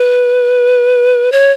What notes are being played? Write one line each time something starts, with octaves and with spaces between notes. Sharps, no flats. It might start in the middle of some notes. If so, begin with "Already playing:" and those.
Already playing: B4
C#5